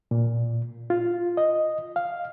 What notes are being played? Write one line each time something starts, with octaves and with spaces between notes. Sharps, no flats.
A#2
F4
D#5
F5